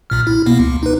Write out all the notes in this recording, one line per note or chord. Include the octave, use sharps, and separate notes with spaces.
B1 A#2 F6
E4
B2 A#3 B3
C#2
D#4 B4